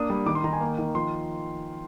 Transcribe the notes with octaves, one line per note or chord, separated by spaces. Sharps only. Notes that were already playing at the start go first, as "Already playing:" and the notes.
Already playing: A#3 D4 D#6
G3
D#3 D6
C6
D#3 A#5
G#5
A#3
D#3
F3 C6